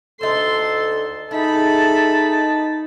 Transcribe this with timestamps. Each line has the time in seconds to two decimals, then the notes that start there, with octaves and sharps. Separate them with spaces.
0.21 D2 D4 D#4 A4 C5 C6
1.31 D#4 E4 G#4 A4 A5 B5